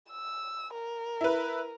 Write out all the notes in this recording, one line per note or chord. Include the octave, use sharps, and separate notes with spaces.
E6
A#4
E4 B4